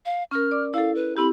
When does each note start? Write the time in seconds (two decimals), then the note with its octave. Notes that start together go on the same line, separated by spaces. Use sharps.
0.06 F5
0.31 C#4 A#4 F6
0.51 D5 D6
0.74 E4 A4 F5
0.95 B4
1.17 C4 E4 G4 B5